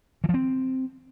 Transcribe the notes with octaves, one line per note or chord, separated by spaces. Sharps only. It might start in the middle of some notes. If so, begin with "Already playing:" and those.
E3
F3
C4